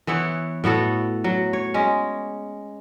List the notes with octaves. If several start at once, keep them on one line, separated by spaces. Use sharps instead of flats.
E3 B3 E4 C#5
A2 B3 F#4 A4
F#3
C#5
G#3 C#4